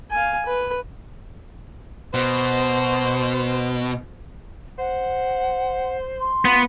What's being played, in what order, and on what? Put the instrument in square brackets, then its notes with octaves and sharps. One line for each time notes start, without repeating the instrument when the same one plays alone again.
[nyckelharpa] F5 G#5
B4
[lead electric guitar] B2 [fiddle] C5
[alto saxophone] C5 [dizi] F#5
[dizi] C6
[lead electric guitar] B3 [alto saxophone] F4